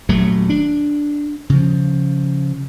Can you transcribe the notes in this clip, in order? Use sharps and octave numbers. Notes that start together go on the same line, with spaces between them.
D#1 F#3 A3
D4
C#3 F3